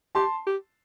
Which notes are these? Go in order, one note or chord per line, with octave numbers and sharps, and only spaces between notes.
G4 A5 C6
G4